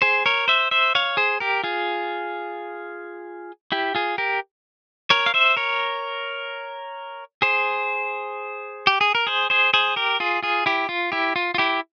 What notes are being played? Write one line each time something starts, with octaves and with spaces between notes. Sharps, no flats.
G#4 C5
A#4 C#5
C5 E5
C5 E5
C#5 F5
G#4 C5
G4 A#4
F4 G#4
E4 G4
F4 G#4
G4 A#4
A#4 C#5
F5
C5 E5
A#4 C#5
G#4 C5
G4
G#4
A#4
G#4 C5
G#4 C5
G#4 C5
G4 A#4
F4 G#4
F4 G#4
E4 G4
F4
E4 G4
F4
F4
E4 G4